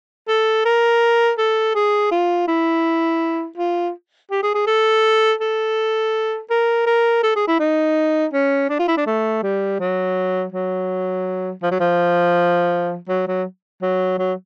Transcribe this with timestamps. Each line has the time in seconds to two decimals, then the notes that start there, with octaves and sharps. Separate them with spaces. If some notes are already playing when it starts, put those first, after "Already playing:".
0.28 A4
0.65 A#4
1.38 A4
1.75 G#4
2.11 F4
2.48 E4
3.58 F4
4.31 G4
4.43 G#4
4.55 G#4
4.67 A4
5.41 A4
6.50 A#4
6.87 A#4
7.23 A4
7.36 G#4
7.48 E4
7.60 D#4
8.33 C#4
8.70 D4
8.79 F4
8.88 E4
8.97 D4
9.07 A3
9.43 G3
9.80 F#3
10.53 F#3
11.63 F3
11.71 F#3
11.80 F3
13.09 F#3
13.28 F#3
13.82 F#3
14.19 F#3